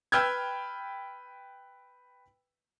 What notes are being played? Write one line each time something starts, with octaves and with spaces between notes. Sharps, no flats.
B4 G5 E6 F6 G6 G#6